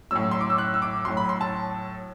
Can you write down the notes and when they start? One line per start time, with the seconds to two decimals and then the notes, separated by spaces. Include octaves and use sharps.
0.11 A2 F#3 E6
0.31 C6
0.41 D6
0.50 E6
0.58 F#6
0.74 E6
0.82 D6
1.05 A2 F#3 C6
1.17 B5
1.29 C6
1.41 A5